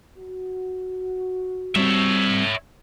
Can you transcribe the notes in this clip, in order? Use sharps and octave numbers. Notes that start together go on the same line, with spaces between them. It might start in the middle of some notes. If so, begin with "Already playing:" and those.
F#4
G3 C4 C#5 E5